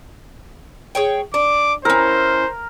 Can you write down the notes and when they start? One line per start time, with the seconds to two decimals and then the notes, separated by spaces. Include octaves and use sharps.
0.95 G#4 C#5 G5
1.34 D4 D6
1.85 C#4 E4 A#4 C5 A#5